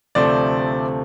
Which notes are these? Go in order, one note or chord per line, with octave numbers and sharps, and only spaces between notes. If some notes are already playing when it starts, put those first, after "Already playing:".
D2 C3 F3 A3 C4 C5 D5